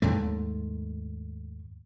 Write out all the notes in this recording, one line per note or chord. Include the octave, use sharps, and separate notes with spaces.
D#2 G#2 A3